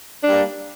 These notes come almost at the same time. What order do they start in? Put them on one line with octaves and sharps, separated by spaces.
D4 G3 A#3